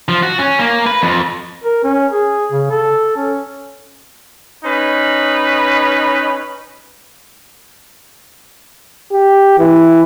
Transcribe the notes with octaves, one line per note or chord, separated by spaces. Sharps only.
F3
F#4
C#4
A#3
B4
F2
A#4
C#4
G#4
C#3
A4
C#4
C#4 D#4 B4
G4
E3